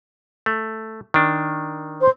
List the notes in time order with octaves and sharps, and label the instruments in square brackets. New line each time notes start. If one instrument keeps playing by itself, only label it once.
[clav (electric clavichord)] A3
D#3 D4
[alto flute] C5